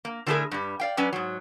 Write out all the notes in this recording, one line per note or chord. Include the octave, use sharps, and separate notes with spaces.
A#3
D3 F#3 A3 E4 G#4 A#4
G2 G3
D5 F5 G5
F#3 C#4 B4 D5
G#2 F#3